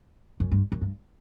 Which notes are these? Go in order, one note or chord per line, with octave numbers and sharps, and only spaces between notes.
F#2
G2
F#2
G2